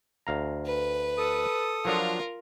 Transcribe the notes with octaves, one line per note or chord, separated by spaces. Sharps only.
D2 F5 A#5
B4
A4 D#6
F3 F#3 D4 F4 A#4